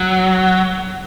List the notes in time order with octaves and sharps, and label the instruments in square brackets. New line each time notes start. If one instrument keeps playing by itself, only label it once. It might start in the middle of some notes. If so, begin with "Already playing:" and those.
Already playing: [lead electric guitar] F#3